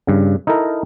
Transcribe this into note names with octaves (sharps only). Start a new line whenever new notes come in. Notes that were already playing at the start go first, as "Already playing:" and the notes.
G2 C#3
D#4 E4 A4 A#4